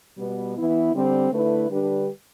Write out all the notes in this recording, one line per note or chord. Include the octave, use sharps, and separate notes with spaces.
B2 G3 B3
E3 B3 E4
D3 G3 C4
D3 A3 E4 B4
D3 G3 D4 G4 B4